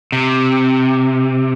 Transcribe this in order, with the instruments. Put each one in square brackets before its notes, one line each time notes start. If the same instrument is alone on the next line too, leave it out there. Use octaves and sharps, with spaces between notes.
[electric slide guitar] C3